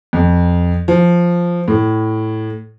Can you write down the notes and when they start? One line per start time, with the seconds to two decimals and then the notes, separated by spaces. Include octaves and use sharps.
0.13 F2
0.88 F3
1.68 A2